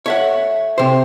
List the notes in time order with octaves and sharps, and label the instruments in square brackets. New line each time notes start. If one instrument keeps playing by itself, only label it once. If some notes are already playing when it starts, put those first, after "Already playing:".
[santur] A3 [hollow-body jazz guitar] C#5 E5 F#5
[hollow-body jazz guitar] C3 C5